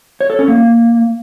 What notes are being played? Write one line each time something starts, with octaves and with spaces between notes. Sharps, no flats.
C#5
A4
C#4
A#3